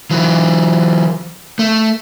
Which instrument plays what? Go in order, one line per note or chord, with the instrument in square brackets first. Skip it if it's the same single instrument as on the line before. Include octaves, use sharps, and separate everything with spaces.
[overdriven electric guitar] E3 F#3
A3